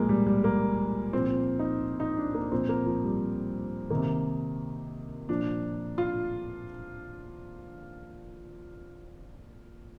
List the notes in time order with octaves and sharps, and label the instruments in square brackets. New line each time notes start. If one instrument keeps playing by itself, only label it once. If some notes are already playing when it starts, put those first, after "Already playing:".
Already playing: [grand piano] A#2 F3 G#3 A#3
G3
G3
A#3
A#2 F3 C4
D#4
D#4
D4
A#3
A#2 F3 C4
A#3
F3
G3
C3 D#3 A#3
A#2 F3 D4
F4